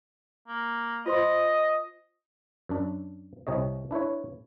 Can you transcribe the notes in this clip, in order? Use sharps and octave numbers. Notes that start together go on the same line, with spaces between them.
A#3
F4 C5 D#5 C6
F#2 D4
C2 C3 C#5 D#5
D4 E4 B4 C#5